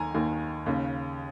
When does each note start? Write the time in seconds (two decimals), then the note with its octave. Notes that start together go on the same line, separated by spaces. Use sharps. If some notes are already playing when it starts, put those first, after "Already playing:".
Already playing: D#2 D#3 G#5 A#5
0.14 D#2 D#3
0.66 D#2 C#3